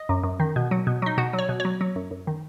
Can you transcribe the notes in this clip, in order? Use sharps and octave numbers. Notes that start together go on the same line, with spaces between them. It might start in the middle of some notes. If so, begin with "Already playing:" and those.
Already playing: D#5
F#2
F#2
D#3
B2
F#3
B2
F#3 D#4
B2 F#4
F#3
C#5
B2
C#5
F#3
F#3
F#2
F#2
D#3